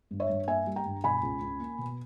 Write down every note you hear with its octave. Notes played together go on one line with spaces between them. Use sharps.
G2
C#5 E5
G2
A#3 E5 G#5
G3
G5 A#5
G2
B2 G#5 B5
C#2
C#2
A#3
B2